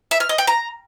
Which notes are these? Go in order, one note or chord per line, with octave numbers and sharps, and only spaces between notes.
E5
F6
D#5
G5
A#5